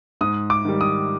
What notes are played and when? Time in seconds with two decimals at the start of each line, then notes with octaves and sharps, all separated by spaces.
0.21 G#2 D#6
0.50 D6
0.65 D#3 G3
0.81 D#6